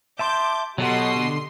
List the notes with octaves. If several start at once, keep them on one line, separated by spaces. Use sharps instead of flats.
E5 A5 C6 D6 G6
B2 F#3 G4 A4 D#5 F#5 C6
D3